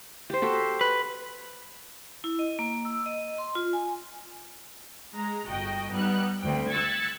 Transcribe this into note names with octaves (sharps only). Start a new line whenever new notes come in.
G4 C5
F#4 G4 A4
B4
E4
D#5
A#3
E6
D#5
C6
F4
G#5
G#3 A#5
G1 F#4 D#5 G5
G3 B3 D#4 F#6
D2 C4 G5
E6 F#6 G#6 A6 B6 C#7